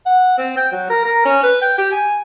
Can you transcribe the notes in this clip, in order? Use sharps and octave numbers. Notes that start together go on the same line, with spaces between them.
F#5
C4
G5
F#3
A#4
A#4
C#4
B4
G5
G4
G#5